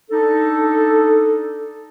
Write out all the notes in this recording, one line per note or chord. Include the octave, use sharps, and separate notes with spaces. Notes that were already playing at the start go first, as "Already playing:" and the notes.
D4 D#4 A4